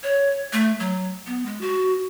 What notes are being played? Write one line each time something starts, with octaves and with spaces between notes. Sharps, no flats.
C#5
A3
F#3
B3
G#3
F#4